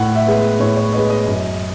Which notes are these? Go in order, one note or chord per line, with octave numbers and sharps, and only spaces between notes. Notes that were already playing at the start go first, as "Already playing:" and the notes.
Already playing: A2 F#5
E5
G#3 B3
A2 C#5
C#5
G#3 B3 D#5
D#5
F#2